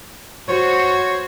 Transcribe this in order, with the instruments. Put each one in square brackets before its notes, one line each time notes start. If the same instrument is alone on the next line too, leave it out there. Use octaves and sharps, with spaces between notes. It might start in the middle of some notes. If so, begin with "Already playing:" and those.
[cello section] F#4 C5 [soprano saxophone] C#5